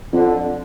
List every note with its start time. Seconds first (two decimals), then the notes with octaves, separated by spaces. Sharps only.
0.12 F2 D3